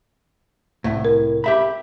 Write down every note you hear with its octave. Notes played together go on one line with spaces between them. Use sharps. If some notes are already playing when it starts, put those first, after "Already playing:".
C2 A2
A#4
G4 E5 B5